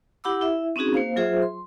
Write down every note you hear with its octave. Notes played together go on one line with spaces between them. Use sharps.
E4 G4 F#5 B5 D6 E6
E4 E5
C4 C#4 D#4 F#4 G#4
A#3 C5 F5
F#3 F4 G#4 C5 E5
C6